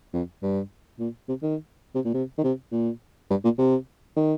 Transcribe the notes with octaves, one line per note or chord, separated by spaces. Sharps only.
F2
G2
A#2
C3
D#3
C3
A#2
C3
D#3
C3
A#2
G2
A#2
C3
D#3